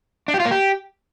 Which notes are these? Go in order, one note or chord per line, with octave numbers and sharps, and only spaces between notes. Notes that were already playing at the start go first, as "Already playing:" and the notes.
D4
G4
F4
A#3
G4